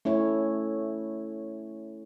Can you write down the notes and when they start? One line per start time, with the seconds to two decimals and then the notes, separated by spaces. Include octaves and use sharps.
0.05 A3 C#4 E4 C#5